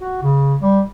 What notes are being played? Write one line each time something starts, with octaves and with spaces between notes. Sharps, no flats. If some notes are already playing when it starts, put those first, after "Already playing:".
F#4
C#3
G3